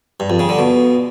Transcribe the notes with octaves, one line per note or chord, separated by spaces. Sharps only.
G2
F2
C#3
D3
B2